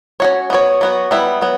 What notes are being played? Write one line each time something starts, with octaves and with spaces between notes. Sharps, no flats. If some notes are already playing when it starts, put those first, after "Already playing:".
C#4 F#4 C#5
B3 F#4 C#5
F#3 B3 F#4
G3 B3 E4
F#3 B3